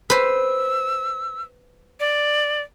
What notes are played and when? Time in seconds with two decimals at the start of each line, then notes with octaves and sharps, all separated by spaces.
0.10 B4 C5 E6
2.00 D5